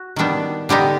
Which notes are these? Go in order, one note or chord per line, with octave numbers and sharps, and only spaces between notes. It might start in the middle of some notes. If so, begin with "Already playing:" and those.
Already playing: F#4
D#3 G3 B3 D4
D3 G3 B3 D#4 G4